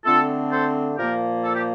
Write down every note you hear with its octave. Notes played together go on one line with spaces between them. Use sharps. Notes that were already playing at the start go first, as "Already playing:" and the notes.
D3 A3 C4 F4 A4
A4 C5
A#2 F3 A#3 G4 A#4
A4
G4